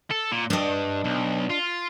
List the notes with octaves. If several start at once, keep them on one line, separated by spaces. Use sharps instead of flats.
A4
A#2
G2 D4 D#5
B1
F4